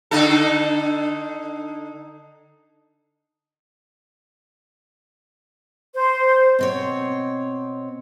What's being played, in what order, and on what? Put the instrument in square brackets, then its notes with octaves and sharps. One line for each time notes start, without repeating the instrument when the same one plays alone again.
[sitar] D3 D#4 A4
[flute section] C5
[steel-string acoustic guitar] B2 C4 C#5